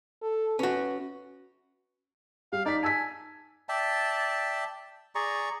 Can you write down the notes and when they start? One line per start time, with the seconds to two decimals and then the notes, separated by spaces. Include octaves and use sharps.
0.22 A4
0.59 C#4 F#4 B4
2.52 G3 F5
2.66 D#4 D5 B6
2.83 G#5 A5 E6 B6
3.69 D5 E5 G5 A5
5.15 G#4 D5 A#5 C#6